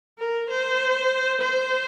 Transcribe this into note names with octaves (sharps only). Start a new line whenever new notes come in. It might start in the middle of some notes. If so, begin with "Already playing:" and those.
A#4
C5
C5